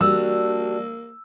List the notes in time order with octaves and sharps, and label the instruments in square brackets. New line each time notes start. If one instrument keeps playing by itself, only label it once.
[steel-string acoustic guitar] G3 D4 [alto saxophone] A#3 [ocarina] F#4 [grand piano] E6